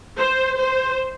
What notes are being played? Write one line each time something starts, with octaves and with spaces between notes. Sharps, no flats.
C5
C5